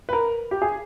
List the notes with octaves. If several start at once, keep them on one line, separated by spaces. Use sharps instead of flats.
B4
A#4
G4
G#4